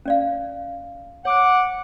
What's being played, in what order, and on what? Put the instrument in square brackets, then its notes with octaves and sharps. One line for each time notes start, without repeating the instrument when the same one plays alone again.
[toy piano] C#4 D5 F5
[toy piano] C#5 [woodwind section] F#5 D6